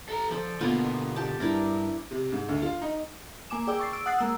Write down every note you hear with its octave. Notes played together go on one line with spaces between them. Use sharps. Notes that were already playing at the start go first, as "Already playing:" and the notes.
A4 A#5
F3 A4 C5 D5
B2 D3 A#3 B3 F4
G4 A5
G2 D4 E4 A#4
C3
G#2
D2
F4
D#4
A#3 G#5 D6 E7
G#4 D5 G5 D6 E6
C#6 A6 C7
E6 D7
F#5 D#6 F#6 A6 C7
G#3 A#3 E6